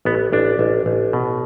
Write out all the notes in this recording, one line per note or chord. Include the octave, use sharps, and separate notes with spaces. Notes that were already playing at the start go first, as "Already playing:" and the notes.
A1 B3
A1 D4
A1
A1
B2